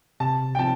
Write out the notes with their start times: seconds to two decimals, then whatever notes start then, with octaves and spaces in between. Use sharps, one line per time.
0.20 C3 A5
0.55 G5
0.59 F3 C4 F4 A5